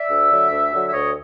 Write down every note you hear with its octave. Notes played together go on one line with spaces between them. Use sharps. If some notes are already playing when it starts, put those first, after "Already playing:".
Already playing: D5 E5
D2
D3 F#3
D2
D3 F#3
E5
D2 C#5 D#5